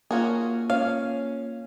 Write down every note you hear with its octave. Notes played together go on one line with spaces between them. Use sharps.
A#3 C#4 F4 F#4 G#4
C#4 F5